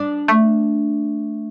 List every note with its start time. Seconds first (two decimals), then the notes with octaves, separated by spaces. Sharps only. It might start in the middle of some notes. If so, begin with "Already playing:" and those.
Already playing: D4
0.28 A3